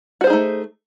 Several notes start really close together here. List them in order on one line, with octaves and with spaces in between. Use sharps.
F#4 C5 G#4 D#4 A3